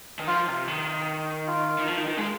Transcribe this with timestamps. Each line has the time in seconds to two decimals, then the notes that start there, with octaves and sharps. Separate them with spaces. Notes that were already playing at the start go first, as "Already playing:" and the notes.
0.19 D#3
0.28 F3 F4
0.48 C3
0.68 D#3
1.48 F4
1.79 D#3
1.88 F3
1.98 D#3
2.08 D#3
2.18 G#3